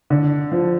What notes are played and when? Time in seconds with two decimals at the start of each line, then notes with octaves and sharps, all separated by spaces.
0.10 D3
0.52 F3